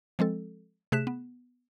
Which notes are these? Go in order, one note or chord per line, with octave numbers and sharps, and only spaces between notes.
F3 G#3 C4 A4
C3 A3 G#4 F#6 B6 E7
B3